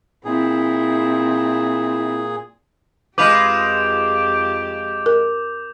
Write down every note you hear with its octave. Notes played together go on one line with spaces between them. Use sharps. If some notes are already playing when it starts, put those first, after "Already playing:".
A#2 C4 E4 G#4
F2 G#3 F4 G4 B4 D6 G6 F7
A#4